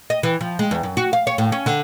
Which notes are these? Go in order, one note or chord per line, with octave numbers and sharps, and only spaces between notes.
D#5
E3
F3
G#3
E2
F#2
F#4
F5
C#5
A2
C#4
D3